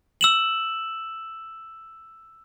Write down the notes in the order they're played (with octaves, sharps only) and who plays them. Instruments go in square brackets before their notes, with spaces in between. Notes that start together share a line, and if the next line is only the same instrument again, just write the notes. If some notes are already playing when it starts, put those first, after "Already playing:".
[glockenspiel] E6 E7 F#7